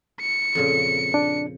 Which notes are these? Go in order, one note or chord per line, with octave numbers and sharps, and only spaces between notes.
C#7
F2 A#2 C#3
D4